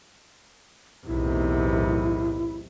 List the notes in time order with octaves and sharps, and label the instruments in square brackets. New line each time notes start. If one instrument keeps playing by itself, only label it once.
[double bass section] B1 A2 [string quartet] E2 C3 D#3 [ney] E4